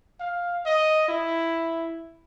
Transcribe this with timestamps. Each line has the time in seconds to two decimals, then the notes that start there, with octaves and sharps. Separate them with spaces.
0.20 F5
0.66 D#5
1.08 E4